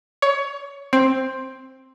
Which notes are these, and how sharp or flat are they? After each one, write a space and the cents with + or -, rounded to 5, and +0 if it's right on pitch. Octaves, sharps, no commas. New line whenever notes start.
C#5 +20
C4 +10